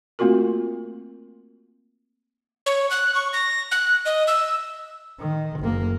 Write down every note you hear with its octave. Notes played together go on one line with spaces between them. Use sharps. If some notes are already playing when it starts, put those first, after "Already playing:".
A3 A#3 C4 F4 F#4 A#4
C#5
F#6
C#6
A#6
F#6
D#5
E6
D#3
F#1 A#3